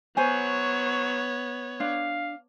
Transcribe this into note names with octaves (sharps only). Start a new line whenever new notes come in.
F#3 B3 C5 C#5 G#5
D4 F5